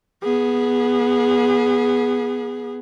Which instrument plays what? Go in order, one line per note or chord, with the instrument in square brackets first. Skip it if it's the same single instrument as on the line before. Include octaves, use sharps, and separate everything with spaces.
[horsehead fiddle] B3 G#4